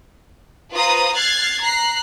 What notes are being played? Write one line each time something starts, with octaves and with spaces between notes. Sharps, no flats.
F4 B4 C5 A#5 D#6
F6 F#6 G#6 A6 C7
A#5 F#6 C7